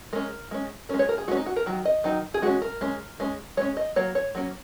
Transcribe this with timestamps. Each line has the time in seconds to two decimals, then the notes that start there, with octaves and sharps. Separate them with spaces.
0.13 G#3 C#4 A#4
0.51 G#3 C#4
0.89 G#3 C#4 A#4
0.99 C#5
1.09 A#4
1.18 G#4
1.28 G#3 C#4 F#4
1.37 D#4
1.46 F#4
1.56 A#4
1.66 D#3 F#3
1.85 D#5
2.04 D#3 F#3 D#4
2.34 G#4
2.42 G#3 C#4 F#4
2.62 A#4
2.81 G#3 C#4
3.20 G#3 C#4
3.57 G#3 C#4 C#5
3.77 D#5
3.96 F#3 A#3 C#5
4.15 C#5
4.35 F#3 A#3 C#4